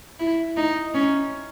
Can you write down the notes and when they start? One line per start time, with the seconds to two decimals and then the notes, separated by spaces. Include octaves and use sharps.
0.19 E4
0.57 D#4
0.94 C#4